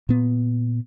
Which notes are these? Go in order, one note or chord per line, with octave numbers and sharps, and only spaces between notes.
A#2 B3